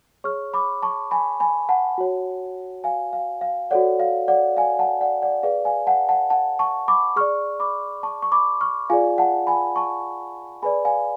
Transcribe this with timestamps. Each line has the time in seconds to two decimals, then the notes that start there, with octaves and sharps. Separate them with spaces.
0.24 G#4 C#5 C#6 F6
0.54 B5 D6
0.82 A5 C#6
1.11 G#5 B5
1.40 G#5 B5
1.69 F#5 A5
1.98 F#4 C#5
2.84 F5 G#5
3.13 F5
3.41 F5
3.71 F#4 A4 C#5 D5 F#5
4.00 F5
4.28 D5 F#5
4.57 F5 G#5
4.79 F#5 A5
5.01 D5 F#5
5.22 D5 F#5
5.43 G#4 B4 D5 F5
5.65 F5 G#5
5.87 F#5 A5
6.09 F#5 A5
6.30 F#5 A5
6.59 A5 C#6
6.88 B5 D6
7.16 G#4 D5 C#6 F6
7.60 B5 D6
8.03 A5 C#6
8.22 C#6
8.32 B5 D6
8.61 C#6 F6
8.90 F4 G#4 D5 F5 G#5
9.18 F#5 A5
9.47 G#5 B5
9.76 A5 C#6
10.62 G#4 B4 D5 G#5 B5
10.85 F5 G#5